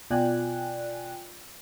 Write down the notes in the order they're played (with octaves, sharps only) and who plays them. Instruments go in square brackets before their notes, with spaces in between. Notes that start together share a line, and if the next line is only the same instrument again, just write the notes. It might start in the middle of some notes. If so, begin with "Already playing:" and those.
[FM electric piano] B2 F4 D5 G5 G#5 F#6